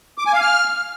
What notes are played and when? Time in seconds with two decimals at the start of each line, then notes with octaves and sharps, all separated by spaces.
0.18 D6
0.26 G#5
0.33 F5
0.41 F6